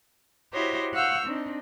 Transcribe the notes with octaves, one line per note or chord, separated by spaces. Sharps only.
E4 F#4 G4 C5 C#5 D#5
F5 F#5 C#6 E6 F6 G6
C4 D4 D#4